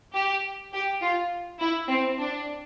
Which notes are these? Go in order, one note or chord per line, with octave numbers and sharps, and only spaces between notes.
G4
G4
F4
E4
C4
D4